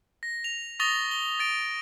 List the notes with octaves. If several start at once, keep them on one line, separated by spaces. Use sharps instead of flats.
A#6
F7
C#6 D#6 A6 A#6 F7 G7
G7
A6 D7